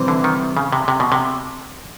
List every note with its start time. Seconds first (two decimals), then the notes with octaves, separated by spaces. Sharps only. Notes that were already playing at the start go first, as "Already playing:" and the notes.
Already playing: C3 E3 G3 C4
0.08 D3
0.24 D#3
0.57 C#3
0.72 C3
0.88 C3
1.00 B2
1.12 C3